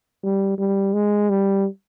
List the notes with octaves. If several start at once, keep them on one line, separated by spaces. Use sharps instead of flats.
G3
G3
G#3
G3